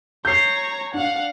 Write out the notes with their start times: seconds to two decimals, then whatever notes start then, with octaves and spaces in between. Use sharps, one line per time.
0.25 C#5 A#5 G6 C7
0.94 D4 F5 F#5